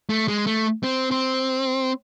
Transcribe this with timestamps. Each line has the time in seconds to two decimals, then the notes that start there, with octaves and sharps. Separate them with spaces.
0.10 A3
0.28 G#3
0.47 A3
0.83 C4
1.11 C4